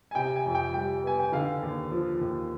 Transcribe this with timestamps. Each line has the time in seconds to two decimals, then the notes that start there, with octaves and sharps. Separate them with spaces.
0.11 G#5
0.15 C3 G5
0.36 G#5
0.46 F2
0.55 G5
0.74 G3 G5
1.03 B3 G#5
1.19 G5
1.32 D3 F5
1.63 D#2
1.91 F3
2.21 D#2